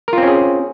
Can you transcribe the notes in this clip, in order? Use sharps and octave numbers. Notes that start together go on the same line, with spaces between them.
C4 C#4 F4 G#4 A#4